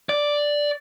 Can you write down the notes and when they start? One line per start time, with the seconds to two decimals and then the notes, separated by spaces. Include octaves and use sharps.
0.09 D5